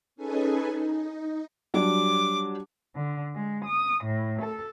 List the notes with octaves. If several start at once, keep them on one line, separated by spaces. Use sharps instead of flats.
C#4 D#4 G#4 A4 B4 G#5
D#4
F#3 G3 D4 D6
D3
G#3
D#6
A2
A4